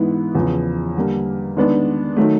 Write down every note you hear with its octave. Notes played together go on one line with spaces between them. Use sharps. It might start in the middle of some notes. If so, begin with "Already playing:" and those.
Already playing: G#2 E3 G#3 B3 E4
E2 C#3 F3
D3 G3 A#3
D#3 G#3 B3 D4
D#3 F#3 A3